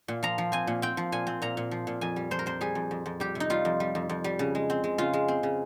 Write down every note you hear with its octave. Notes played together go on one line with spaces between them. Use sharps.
A#2
F3 A#5
F3
C4 G#5
A#2
C4 G5
F3
A#2 G#5
C4
A#2 A#5
A#2
F3
A#2
F2 G#5
G3
F2 C5
A#4
F2 C5
G3 G#4
F2
F2
F2
G3 G4
C3
D#4
G3 F4
F2
G3
F2
F2
G3
C#3
G#3
C4
G#3
C#3 F4
G#3
C4
C#3